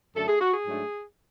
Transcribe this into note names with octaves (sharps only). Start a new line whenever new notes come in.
F#2 D3 A3 A4
G#4
F#4
G#4
G#2 F#3 A3 D4